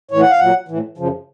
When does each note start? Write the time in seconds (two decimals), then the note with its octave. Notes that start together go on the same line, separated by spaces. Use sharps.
0.11 A2 E3 C#5
0.21 F#5
0.30 F5
0.39 A#2 F#3 F#5
0.68 A2 E3
0.98 F#2 C#3 F3